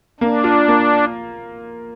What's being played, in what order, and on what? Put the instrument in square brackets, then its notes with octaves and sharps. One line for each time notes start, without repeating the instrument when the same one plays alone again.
[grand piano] A#3 [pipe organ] D4
[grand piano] F4
A#3